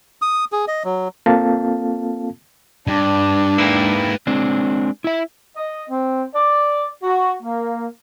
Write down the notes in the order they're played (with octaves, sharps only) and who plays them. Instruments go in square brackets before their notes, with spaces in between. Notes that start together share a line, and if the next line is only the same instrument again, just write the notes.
[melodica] D#6
G#4
D#5
F#3
[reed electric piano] A#3 C4 F4 A4 F5 A5
[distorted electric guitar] G2 [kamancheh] D4
[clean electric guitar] G#2 A#3 E4 [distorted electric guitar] B4 G5
[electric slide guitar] G#3 C4 D4
E4 E5
[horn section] D#5
C4
D5
F#4
A#3